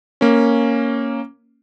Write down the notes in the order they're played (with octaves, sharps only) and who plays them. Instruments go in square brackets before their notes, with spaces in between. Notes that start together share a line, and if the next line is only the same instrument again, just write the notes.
[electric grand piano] A#3 C#4